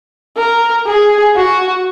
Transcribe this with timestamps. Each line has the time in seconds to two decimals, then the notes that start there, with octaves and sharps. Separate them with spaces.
0.37 A#4
0.86 G#4
1.36 F#4